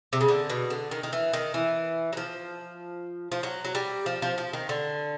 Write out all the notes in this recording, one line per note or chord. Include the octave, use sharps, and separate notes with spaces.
C3
C#3
D3
B2
D3
D#3
D#3
E3
D#3
E3
F#3
F3
F3
F#3
F#3
G3
F3
F3
F3
D#3
D3